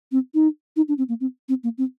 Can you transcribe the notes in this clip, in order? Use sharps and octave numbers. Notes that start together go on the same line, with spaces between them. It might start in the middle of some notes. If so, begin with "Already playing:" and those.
C4
D#4
D#4
D4
C4
A#3
C4
C4
A#3
C4